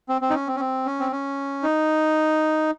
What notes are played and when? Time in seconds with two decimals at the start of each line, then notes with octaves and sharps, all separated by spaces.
0.09 C4
0.21 C4
0.30 D#4
0.35 C#4
0.48 C4
0.56 C#4
0.60 C4
0.86 C#4
1.00 C4
1.12 C#4
1.63 D#4